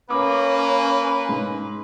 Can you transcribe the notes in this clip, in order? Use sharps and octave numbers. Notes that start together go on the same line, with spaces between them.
A#3 C#4 B4 D6
G#2